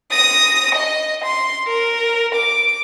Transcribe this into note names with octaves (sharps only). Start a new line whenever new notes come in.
D#6 A#6
D#5
C6
A#4
D6